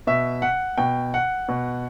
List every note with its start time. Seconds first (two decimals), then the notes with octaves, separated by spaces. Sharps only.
0.07 B2 E5
0.42 F#5
0.78 B2 G5
1.14 F#5
1.48 B2